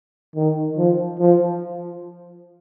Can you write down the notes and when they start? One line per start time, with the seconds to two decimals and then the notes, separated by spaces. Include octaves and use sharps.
0.36 D#3
0.78 F3
1.20 F3